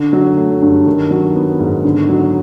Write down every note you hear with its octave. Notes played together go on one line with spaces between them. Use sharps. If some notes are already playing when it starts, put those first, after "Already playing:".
Already playing: D3
F#3
A3
G2
D#3
F#3
B3
G#2
D3
F#3